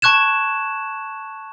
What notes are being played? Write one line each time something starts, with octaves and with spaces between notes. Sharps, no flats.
A5 C#6 F#6 G#6 E7